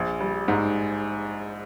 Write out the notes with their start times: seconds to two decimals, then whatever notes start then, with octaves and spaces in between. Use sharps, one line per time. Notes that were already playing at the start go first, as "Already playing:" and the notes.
Already playing: A#1
0.21 G3
0.48 G#2